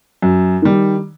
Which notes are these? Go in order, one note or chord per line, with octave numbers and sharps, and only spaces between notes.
F#2
D#3 G3